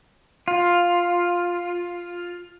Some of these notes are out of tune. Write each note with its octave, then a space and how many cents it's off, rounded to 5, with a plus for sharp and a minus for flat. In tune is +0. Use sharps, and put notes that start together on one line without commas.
F4 +5